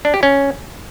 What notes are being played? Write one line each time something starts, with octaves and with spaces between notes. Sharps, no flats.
D4
G4
C#4